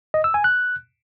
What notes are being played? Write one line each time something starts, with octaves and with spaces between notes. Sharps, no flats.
D#5
E6
G#5
F#6